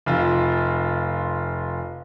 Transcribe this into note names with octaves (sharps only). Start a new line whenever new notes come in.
F1 F4